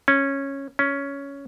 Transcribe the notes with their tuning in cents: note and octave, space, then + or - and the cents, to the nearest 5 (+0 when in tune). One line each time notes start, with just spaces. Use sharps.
C#4 -10
C#4 +10